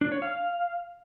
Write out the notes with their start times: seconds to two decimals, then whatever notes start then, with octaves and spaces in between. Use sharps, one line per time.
0.01 D4
0.12 C#5
0.22 F5